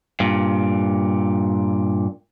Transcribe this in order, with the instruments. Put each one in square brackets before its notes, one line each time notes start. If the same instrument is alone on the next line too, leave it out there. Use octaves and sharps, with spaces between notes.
[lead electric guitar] G2 A#2